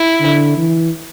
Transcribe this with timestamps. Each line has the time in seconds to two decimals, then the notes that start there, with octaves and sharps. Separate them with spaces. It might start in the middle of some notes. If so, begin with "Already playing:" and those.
Already playing: E4
0.20 D3
0.57 E3